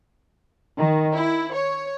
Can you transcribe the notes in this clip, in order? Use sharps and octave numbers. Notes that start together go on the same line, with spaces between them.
D#3
E4
C#5